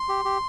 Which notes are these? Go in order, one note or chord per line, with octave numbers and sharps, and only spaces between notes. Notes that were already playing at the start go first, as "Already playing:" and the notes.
Already playing: C6
G4
G4